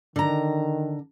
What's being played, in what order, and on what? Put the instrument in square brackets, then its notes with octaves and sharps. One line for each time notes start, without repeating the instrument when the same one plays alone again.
[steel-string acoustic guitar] D3 A#5 [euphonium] D#3